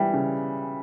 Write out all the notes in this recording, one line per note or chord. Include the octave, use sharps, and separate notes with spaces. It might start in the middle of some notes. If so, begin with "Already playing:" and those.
Already playing: E3 G3
C#3